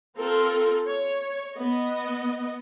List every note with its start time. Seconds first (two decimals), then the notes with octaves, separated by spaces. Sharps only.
0.17 C4 F4 A4 A#4
0.87 C#5
1.56 B3 D#5